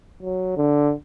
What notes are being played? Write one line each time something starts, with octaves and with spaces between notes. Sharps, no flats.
F#3
D3